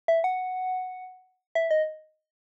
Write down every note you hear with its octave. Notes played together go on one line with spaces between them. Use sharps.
E5
F#5
E5
D#5